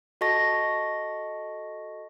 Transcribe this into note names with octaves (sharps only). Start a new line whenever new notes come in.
F#4 A4 D#5 A5 C#6 A#6